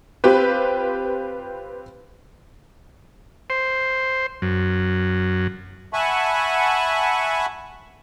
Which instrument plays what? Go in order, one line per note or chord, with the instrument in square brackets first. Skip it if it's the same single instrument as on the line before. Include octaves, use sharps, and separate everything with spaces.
[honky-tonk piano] C4 F4 G4 B4
[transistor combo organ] C5
F#2
[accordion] E5 F#5 G#5 A5 B5 C#6